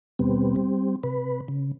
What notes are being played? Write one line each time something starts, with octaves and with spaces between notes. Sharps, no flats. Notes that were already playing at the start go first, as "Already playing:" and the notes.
D#2 B2 G3 B3 C4
G3 C4
C3 B4
C#3